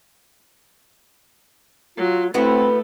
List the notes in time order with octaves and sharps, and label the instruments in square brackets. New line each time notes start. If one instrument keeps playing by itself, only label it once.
[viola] F#3 [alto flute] F4
[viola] A3 [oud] B3 E4 F#4 [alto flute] C4